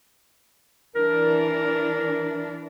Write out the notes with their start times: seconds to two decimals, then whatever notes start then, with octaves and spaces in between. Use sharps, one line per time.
0.95 E3 D4 A#4